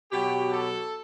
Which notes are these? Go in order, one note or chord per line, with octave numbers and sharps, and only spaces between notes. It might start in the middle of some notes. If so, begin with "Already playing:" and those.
B2 F#3 G4
A4